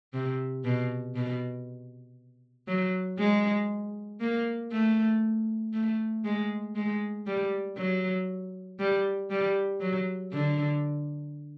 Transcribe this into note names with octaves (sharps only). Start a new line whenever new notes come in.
C3
B2
B2
F#3
G#3
A#3
A3
A3
G#3
G#3
G3
F#3
G3
G3
F#3
D3